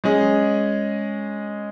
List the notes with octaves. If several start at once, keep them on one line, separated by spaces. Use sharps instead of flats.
G#3 C#4 G#4